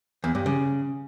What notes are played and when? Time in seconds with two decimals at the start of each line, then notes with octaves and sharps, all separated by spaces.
0.24 E2
0.35 G2
0.46 C#3